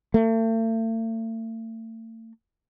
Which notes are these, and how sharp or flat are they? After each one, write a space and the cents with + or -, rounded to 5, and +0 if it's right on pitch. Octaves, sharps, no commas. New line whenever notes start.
A3 +40